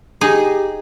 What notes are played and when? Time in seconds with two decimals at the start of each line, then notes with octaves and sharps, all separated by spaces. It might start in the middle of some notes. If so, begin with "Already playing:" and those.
0.21 D#4 G4 G#4